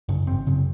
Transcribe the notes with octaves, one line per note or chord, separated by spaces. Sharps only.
F#2 C#3
G#1 C4
F#2 C#3